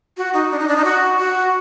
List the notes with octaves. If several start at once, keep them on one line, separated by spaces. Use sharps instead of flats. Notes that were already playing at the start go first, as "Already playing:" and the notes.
F#4
D#4
D4
D#4
D4
D#4
F#4
F#4